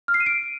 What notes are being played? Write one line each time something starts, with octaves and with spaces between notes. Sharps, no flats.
F6
C7
D#7
D7